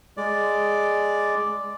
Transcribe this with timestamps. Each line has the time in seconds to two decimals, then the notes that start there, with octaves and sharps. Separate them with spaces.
0.17 G#3 D5